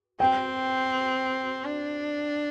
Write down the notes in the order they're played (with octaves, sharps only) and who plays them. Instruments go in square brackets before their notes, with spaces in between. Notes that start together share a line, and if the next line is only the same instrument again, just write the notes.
[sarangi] C4 [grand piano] G5
[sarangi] D4